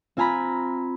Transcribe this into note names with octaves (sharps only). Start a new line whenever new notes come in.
C4 F4 G#5 A#5 B5